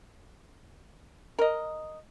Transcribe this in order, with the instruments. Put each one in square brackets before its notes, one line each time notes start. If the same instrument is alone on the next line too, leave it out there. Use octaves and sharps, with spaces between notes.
[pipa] A#4 D#5